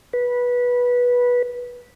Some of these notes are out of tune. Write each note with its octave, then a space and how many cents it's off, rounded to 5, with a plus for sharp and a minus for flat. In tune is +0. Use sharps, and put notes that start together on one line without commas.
B4 -15